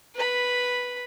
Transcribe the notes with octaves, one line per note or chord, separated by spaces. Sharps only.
B4 B5